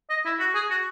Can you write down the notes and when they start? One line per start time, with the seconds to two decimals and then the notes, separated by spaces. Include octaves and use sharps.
0.10 D#5
0.25 E4
0.40 F#4
0.54 G#4
0.70 F#4